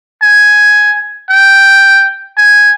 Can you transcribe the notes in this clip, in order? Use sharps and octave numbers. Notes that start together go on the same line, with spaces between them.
G#5
G5
G#5